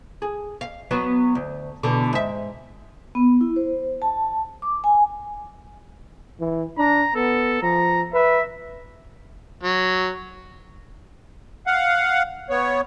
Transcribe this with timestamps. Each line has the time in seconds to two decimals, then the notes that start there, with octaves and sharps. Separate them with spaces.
0.22 G#4
0.61 F5
0.91 F#3 B3 F#4
1.35 D2
1.83 E2 B2 D3
2.13 G#2 E5
3.15 B3
3.41 E4
3.56 C5
4.02 A5
4.62 D6
4.84 G#5
6.40 E3
6.78 D4 A#5
7.15 B3 A4
7.62 F3 A#5
8.14 B4 E5
9.64 F#3
11.67 F5 F#5
12.50 B3 C#5